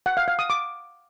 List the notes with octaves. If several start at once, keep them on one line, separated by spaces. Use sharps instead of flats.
F#5
F5
F5
D#6
D6